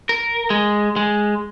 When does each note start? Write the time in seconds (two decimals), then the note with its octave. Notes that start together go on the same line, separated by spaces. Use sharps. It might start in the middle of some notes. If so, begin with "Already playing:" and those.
0.09 A#4
0.50 G#3
0.96 G#3